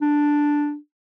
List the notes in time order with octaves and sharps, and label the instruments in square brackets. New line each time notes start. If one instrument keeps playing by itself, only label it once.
[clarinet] D4